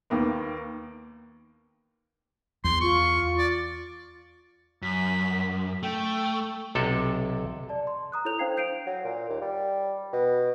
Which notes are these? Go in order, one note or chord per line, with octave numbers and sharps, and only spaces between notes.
D#2 D#3 A#3 B3
E2 C6
F4 C#6
D5
F#2 B6
A3 G5
B1 C3 A4
D5 A5
C6
A#5 D#6 F#6
E4 A4 C#5 G6 F7
D4 C5 F5 G5 G#6 C7
G6 C7 D7 D#7 F7
F#3
A#2
D#2
G3
B2